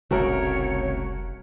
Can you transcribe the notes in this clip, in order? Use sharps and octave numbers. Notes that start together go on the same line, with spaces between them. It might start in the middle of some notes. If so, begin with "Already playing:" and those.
F1 C2 A2 C#3 A3 F#4 A#4 C#5